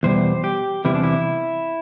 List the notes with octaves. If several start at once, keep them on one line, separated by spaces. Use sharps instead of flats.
E2 B2 G3 C5
G4
E2 C3 E3 G3 E4
D4
E4